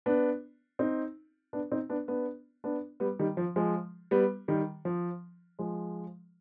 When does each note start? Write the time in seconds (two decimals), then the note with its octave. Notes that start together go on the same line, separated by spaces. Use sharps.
0.06 B3 D4
0.79 C4 D#4
1.53 B3 D4
1.72 C4 D#4
1.89 B3 D4
2.08 B3 D4
2.64 B3 D4
3.00 G3 B3
3.19 D#3 G3
3.37 F3
3.56 F3 G#3
4.11 G3 B3
4.48 D#3 G3
4.85 F3
5.59 F3 G#3